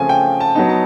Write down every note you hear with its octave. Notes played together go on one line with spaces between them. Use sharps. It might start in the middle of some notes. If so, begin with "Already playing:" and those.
Already playing: C#3 F3 A3 C4 G#5
G5
A5
F#3 B3 D#4 A5
A5